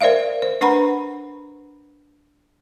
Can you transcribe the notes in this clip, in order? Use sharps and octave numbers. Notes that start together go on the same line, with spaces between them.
A#4 C5 D5 E5 F5
C5
D4 B4 F#5 A#5 B5